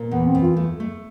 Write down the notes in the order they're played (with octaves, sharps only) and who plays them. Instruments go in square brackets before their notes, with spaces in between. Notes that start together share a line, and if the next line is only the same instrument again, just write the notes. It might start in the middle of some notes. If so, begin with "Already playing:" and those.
Already playing: [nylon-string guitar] A#2
[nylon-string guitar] E2 [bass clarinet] B3
[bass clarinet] C4
[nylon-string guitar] E2
[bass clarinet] F4
[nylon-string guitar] A3
A3